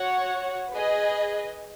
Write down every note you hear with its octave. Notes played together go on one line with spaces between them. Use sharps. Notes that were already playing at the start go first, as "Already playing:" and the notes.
Already playing: F#4 C#5 F#5
G#4 B4 D#5